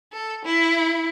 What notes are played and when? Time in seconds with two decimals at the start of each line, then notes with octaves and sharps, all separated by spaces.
0.13 A4
0.45 E4